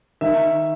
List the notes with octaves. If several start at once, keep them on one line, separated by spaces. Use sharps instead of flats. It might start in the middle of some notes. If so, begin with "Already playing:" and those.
D#3 E5